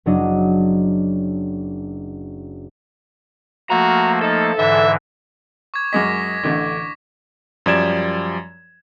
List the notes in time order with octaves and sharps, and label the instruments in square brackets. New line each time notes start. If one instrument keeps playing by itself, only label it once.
[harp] F#1 F#3 D4 D#5
[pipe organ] F3 A3 A#3 [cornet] F#4 [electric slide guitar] A#5
[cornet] D#4 [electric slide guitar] A4
[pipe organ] G#2 D3 E3 [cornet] E5
[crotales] C#6 D6 G#6
[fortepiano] F#2 G#3 D#5 [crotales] D6 A#6 B6
[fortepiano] A1 D3 A3
[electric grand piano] F#2 F3 G3 D5 G#6 E7